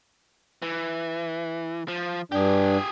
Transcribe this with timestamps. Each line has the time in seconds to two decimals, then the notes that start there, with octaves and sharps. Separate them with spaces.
0.62 E3
1.88 F3
2.32 G2 D4 G4 G#4